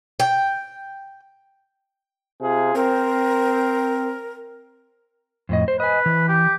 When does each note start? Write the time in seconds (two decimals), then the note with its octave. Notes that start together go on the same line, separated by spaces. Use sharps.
0.20 G5
2.41 C3 F4 G#4
2.75 C4 A#4
5.49 F2 A2 D#5
5.68 C5
5.80 B4 D#5 G#5
6.06 E3
6.28 G4